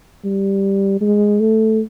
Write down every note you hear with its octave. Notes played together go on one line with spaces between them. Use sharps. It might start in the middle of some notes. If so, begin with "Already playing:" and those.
G3
G#3
A3